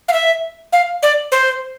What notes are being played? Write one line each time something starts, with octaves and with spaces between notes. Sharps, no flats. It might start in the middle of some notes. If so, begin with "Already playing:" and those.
F5
E5
F5
D5
C5